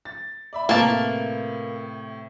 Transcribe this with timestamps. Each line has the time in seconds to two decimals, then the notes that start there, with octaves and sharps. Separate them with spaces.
0.05 A6
0.53 D5 E5 B5
0.69 A2 C3 A#3 B3 A5